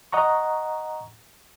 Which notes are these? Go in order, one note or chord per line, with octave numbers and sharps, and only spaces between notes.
D#5 F#5 A#5 C#6